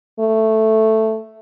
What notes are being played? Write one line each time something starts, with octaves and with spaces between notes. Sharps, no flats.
A3